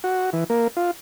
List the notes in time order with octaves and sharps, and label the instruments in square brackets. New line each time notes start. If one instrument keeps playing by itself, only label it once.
[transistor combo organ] F#4
E3
A#3
F4